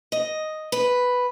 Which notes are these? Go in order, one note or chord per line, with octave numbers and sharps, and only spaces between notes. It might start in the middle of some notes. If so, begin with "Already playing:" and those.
D#5
B4